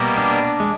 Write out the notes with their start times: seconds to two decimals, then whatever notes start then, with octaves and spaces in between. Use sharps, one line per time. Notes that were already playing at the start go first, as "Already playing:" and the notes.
Already playing: B2 G3 A#3
0.18 D4
0.60 G#3